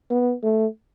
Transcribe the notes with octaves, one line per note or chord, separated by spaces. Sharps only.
B3
A3